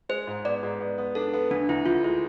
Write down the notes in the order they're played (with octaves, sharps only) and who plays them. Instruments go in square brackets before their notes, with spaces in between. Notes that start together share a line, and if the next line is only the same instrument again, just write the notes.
[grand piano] G#3 [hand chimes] C5
[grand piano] G#2
[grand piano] B3 [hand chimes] D5
[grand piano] G#2
B3
B3
[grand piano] D4 [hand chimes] A4
[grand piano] B3
[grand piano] D2 [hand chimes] D4
[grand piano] D2 [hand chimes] E4
[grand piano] D2 [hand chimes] F4
[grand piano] G#3 [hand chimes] E4